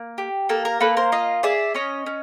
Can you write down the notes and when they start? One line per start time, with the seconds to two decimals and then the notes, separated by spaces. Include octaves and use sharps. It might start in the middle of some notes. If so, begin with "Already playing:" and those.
Already playing: A#3
0.18 G4
0.49 A#3 A4
0.65 A#4
0.80 A#3 A4 B4
0.97 A#4 C5
1.12 F4 D#5 F5
1.43 G#4 D5 E5
1.74 C#4 C#5 D#5
2.06 C#4